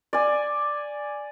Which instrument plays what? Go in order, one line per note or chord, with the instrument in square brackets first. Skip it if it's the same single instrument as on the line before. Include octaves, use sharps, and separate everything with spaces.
[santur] D5 G#5